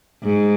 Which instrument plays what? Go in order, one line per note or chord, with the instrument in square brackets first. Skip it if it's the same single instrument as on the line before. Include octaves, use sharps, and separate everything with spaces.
[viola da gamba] G#2